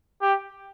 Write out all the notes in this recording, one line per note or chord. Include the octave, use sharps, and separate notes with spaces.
G4